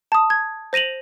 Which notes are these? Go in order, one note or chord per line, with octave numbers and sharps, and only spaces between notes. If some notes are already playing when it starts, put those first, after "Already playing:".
A5 D#6
G#6
C5 A#6 D#7 F7 F#7